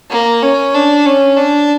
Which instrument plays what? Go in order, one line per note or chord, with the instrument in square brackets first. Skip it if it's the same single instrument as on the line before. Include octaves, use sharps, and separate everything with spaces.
[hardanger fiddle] A#3
C#4
D4
C#4
D4